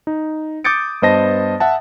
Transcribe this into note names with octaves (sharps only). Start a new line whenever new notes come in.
D#4
D6 D#6 G6 A6 C#7 D7
G2 B3 C5 D#5 A5 A#6
E5 F#5 A5